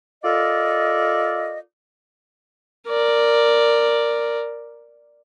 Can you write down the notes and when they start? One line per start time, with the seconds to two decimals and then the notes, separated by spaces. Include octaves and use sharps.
0.24 F4 A4 A#4 D5 D#5
2.88 A#4 D5